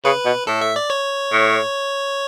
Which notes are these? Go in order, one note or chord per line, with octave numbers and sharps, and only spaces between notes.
C#3 B4
B2
A2 A4
E5
D5
C#5
A2